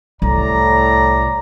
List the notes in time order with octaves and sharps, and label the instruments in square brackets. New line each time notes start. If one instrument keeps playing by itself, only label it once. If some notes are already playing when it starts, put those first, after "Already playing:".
[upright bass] C2 [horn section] A2 D5 A#5